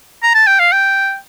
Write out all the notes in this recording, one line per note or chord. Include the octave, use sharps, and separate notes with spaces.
A#5
A5
G5
F5
G5